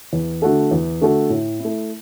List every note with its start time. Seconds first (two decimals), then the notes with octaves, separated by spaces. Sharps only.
0.13 E2
0.42 D3 A3 F#4 A4
0.71 E2
1.01 D3 A3 F#4 A4
1.30 A2
1.60 A3 E4